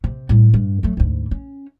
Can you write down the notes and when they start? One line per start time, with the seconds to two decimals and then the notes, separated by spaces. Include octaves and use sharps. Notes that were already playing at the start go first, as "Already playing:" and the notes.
0.04 C3
0.29 A2 G3
0.54 G2
0.83 F#3 A3
0.97 D2 G#2
1.31 C#4